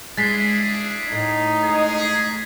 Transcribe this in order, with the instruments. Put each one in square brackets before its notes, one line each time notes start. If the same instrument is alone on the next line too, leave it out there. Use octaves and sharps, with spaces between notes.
[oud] G#3 [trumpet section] D4 E4 G#4 [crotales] A6 B6 C7
[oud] A2 [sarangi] D#4
[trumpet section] G#3 G#4